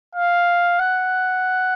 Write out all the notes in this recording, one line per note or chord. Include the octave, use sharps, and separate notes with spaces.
F5
F#5